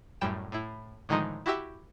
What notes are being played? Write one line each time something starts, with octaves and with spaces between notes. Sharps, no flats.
F#2 A2 G3 G5 E7
A2 E4
A2 D3 D#3 F3 G#3 D#4
E4 F#4 G4 E5